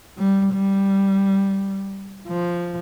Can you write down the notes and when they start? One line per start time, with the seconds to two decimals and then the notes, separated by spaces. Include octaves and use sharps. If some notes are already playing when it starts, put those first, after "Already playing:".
0.18 G3
0.53 G3
2.28 F3